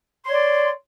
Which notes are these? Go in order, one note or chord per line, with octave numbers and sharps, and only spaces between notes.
C#5 D5 C6